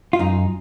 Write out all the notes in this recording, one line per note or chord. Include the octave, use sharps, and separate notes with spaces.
F4
F#2 D#4